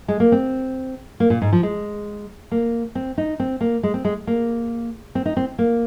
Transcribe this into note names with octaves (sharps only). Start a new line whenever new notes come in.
G#3
A#3
C4
A#3
A#2
G#2
F3
G#3
A#3
C4
D#4
C4
A#3
G#3
C4
G#3
A#3
C4
D#4
C4
A#3